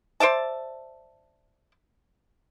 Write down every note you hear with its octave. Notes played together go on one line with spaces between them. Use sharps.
C5 D5 E5 A5